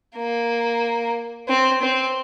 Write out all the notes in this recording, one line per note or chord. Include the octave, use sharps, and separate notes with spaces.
A#3
C4
C4